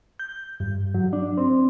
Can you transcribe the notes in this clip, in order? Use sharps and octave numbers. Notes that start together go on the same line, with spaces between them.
G6
G2
F#3
D4
C4